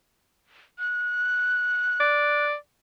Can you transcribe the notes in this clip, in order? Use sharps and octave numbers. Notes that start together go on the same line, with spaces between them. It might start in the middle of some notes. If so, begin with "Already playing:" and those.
F#6
D5